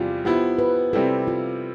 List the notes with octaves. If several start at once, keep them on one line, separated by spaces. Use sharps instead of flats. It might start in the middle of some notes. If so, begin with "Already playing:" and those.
Already playing: E2 C3 G3 F4
F3 B3 E4 G4
B4
C3 G3 C4 E4 A4
F4